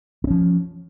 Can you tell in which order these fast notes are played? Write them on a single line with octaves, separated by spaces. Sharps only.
C4 C#4 F3